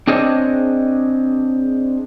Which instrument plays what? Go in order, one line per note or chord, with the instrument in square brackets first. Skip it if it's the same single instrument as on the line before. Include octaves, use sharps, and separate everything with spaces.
[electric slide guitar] C4 D4 G#4 C5 C#5 D#5